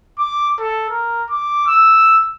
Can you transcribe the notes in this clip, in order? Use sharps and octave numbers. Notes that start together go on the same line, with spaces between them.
D6
A4
A#4
D6
E6